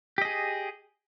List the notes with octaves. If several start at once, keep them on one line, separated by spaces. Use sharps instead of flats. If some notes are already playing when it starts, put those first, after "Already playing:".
G4 G#4 D#5